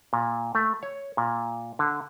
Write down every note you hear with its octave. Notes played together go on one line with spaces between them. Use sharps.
A#2
A3
C#5
A#2
D3